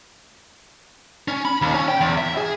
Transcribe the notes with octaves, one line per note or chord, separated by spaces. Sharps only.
C#4
B5
D#2
C#4
G5
E2
E5
G#4